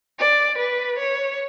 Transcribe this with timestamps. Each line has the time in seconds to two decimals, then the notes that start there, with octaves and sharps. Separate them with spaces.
0.19 D5
0.58 B4
0.99 C#5